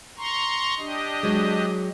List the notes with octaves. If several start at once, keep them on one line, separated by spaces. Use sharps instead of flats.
A#5 C6 C#6
D4 G4 D#5
F#3 G#3